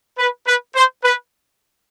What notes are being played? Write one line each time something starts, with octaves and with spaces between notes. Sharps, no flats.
B4
B4
C5
B4